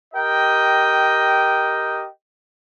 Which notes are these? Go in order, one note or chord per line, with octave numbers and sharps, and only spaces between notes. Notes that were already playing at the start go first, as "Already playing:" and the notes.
G4 A#4 D#5 G5